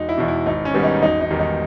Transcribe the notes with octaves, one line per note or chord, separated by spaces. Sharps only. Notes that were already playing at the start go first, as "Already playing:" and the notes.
Already playing: E1 D#4
E4
E2 B2
E4
G#1 D#4
C#4
G#2 D#3 G3 B3
D#4
E1 D#4
D#4
E2 D#3 G3
D#4